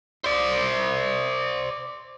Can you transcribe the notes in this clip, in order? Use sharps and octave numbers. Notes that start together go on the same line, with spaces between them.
C5 D5